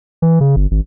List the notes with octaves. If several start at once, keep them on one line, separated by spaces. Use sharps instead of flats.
E3
C#3
G1
G#1